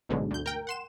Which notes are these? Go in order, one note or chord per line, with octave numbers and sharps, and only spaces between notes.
A1 G#2 B2 D3 F#3 G#3
D2 G6
A#4 G5
F#5 C6 E7